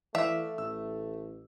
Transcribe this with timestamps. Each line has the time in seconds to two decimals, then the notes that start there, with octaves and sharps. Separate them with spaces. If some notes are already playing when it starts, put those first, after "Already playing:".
0.15 E3 A3 D5 E5 F5
0.58 A1 E6